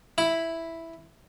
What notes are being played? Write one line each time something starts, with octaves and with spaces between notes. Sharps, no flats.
E4 B5